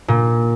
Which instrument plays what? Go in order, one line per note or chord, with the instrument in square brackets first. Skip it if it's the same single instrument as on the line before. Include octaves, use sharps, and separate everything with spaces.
[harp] A#2